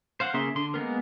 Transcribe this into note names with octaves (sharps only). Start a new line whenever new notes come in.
C5 F5 F#5
C#3 A#3 G#4 E5 C6
D3 C6
G#3 A#3 B3 A#4